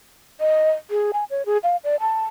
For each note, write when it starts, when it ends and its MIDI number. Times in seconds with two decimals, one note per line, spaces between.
0.40 0.71 75
0.91 1.11 68
1.13 1.24 80
1.30 1.45 73
1.46 1.57 68
1.63 1.76 77
1.84 1.96 74
2.00 2.25 81